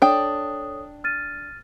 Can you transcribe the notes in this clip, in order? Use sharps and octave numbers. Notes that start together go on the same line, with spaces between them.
D4 A4 C#5 G5 D#6
F6 A6 D#7